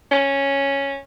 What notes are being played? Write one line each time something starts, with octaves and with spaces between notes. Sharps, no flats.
C#4